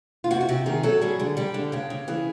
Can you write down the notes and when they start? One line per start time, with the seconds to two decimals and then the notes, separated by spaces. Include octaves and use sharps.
0.24 F4
0.31 C3 F#4
0.41 F#4
0.49 C3 G4
0.66 D#3 G#4
0.83 F#3 A4
1.01 G3 G#4
1.20 D3
1.37 G3 G4
1.54 D3
1.72 C#3 G4
1.90 C#3
2.08 E3 G#4